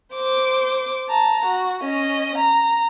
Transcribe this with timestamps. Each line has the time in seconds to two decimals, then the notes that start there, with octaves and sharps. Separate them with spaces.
0.15 C5 D6
1.09 A5 A#5
1.45 F#4
1.84 C#4 D#5
2.38 A#5